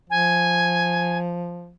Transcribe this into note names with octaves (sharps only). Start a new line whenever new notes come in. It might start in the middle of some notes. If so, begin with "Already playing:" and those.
F3 G#5